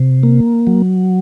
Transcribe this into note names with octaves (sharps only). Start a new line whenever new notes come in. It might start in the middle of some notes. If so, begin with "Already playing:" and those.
Already playing: C3
A#3
F#3